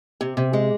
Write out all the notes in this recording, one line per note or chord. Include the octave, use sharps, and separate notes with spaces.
C3
C3
G#3